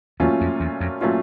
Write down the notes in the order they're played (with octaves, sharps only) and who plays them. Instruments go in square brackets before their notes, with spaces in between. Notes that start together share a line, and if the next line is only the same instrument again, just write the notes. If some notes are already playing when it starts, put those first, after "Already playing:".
[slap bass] E2 [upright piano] A#2 F#3 A3 C#4 F4
[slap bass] F2
E2
F2
[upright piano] A#2 F#3 A3 C#4 F4